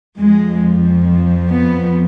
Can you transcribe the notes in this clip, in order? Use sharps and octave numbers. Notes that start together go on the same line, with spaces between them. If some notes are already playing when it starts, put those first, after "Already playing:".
F2 F3 G#3
B3